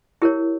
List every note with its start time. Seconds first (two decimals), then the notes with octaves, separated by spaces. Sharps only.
0.22 E4 G4 A#4 C#5